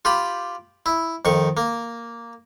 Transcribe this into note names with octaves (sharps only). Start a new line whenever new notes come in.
F4 G4 B5
E4
F2 D#3 C#6
A#3